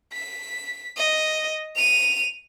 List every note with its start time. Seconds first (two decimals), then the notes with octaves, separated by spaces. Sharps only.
0.13 B6
0.96 D#5
1.76 D#7 F7